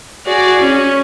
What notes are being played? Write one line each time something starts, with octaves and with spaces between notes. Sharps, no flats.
F#4 G#4 D5
C#4